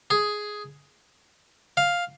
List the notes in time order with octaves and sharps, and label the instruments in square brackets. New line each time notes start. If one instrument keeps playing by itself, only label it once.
[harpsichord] G#4
F5